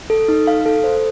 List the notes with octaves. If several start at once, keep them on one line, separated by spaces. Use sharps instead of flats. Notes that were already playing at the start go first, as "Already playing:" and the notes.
A4
D#4
F5
A4
C5